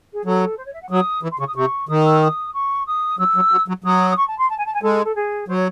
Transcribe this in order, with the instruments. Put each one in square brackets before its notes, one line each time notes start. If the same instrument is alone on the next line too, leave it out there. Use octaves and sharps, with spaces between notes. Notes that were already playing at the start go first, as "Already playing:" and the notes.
[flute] G#4
[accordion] F#3 [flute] A4
[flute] C5
C#5
E5
F#5
[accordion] F#3 [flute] D#6
[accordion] E3
[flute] C6
[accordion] C#3 [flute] C#6
[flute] D#6
[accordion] C3 [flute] C#6
[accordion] D#3 [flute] D#6
[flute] E6
D#6
C#6
D#6
[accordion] F#3 [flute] E6
[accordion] F#3
F#3
F#3
[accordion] F#3 [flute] D#6
[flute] D#6
C#6
A5
C6
A5
G#5
A5
G#5
[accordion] G#3 [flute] A4
[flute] A4
G#4
[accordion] F#3 [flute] C5
[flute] C#5